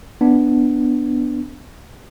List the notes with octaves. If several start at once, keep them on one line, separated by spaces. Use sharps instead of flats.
B3 D4